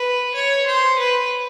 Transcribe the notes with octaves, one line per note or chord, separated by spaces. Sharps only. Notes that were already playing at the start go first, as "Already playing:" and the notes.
Already playing: B4
C#5
C5
B4